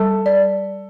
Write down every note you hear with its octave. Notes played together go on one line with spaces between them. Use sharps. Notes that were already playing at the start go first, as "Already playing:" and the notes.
Already playing: G3 A4
D5